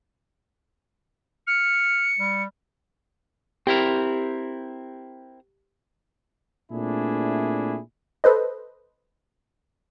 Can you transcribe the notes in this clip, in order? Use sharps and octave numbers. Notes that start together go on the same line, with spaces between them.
F6 C#7
G3
C4 E4 G4 A#4
A#2 A3 C4 D4 E4 G#4
A4 B4 C5 D#5